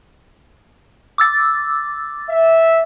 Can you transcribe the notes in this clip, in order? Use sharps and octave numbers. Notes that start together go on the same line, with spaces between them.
D6 E6 A6
E5